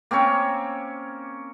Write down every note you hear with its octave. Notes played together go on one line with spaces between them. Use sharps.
A#3 C4 C#4 C#5